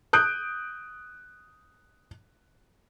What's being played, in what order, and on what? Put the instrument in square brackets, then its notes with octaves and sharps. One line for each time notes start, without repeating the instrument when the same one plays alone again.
[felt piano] D#6 F#6 G6 D7